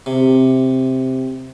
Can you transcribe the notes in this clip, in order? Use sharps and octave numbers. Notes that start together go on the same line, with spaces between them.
C3